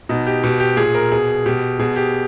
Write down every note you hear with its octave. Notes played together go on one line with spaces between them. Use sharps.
B2 D#4
G4
B2 G4
G4
A#2 G#4
A#4
B2 G#4
B2 G4
B2 G#4
G4